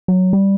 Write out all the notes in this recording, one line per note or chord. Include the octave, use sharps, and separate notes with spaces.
F#3
G3